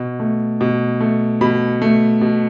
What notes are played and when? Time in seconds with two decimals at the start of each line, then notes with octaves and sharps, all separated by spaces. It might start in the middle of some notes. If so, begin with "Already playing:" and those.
Already playing: B2
0.20 A3
0.61 B2
1.00 A3
1.41 B2 B5
1.82 A3
2.21 B2